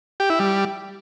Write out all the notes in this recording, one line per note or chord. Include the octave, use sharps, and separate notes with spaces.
G4
E4
G3